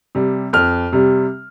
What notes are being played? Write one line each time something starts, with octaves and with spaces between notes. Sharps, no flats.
C3 G3
F2 F6
C3 G3